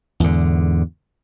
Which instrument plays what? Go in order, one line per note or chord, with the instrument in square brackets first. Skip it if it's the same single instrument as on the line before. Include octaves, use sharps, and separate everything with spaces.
[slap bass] E2 G#2 D3